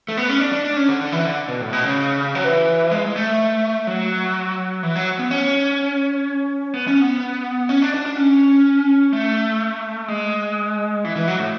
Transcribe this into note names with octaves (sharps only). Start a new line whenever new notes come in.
A3
B3
C#4
D4
D4
D4
C#4
D3
D3
E3
D3
B2
A2
B2
C#3
F#3
E3
G#3
G#3
A3
F#3
E3
F#3
B3
C#4
B3
C#4
B3
C#4
D4
D4
D4
C#4
A3
G#3
E3
E3
F#3
A2